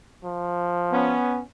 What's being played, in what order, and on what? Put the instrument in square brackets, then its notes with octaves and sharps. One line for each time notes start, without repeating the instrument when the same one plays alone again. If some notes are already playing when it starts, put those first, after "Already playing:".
[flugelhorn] F3
[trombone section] B3 C#4